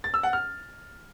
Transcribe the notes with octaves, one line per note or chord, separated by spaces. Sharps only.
A6
E6
F#5
F6